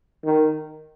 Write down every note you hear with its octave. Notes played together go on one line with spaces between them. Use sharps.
D#3